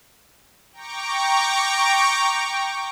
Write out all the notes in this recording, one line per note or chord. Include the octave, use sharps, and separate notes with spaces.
G5 A#5 C#6 D6